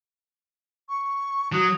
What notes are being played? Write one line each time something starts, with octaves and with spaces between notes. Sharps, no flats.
C#6
F#3 D#6